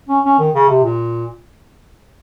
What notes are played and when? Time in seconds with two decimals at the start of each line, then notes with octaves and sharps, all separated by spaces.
0.09 C#4
0.24 C#4
0.39 D#3
0.54 C#3
0.69 C3
0.84 A#2